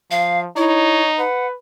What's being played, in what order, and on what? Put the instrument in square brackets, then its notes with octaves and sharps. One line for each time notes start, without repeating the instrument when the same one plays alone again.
[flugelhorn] F3 [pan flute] F5
[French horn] D#4 [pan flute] E4 [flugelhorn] C#5
[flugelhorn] B4 [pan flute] F#5